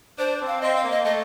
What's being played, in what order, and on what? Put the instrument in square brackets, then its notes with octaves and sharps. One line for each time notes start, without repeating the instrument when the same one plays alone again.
[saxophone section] D4 [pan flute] C5
[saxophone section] C4
[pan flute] F5
[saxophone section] C4 [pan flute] D#5
[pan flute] F5
[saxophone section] A#3
[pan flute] D#5
[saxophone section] A3 [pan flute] D#5